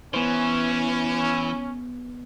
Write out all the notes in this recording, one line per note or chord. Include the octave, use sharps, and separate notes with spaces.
E3 B3 C#4 C5